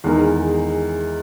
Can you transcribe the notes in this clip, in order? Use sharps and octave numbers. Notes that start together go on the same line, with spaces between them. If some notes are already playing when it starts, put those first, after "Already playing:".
E2 D#3 G#3 D#4 A#4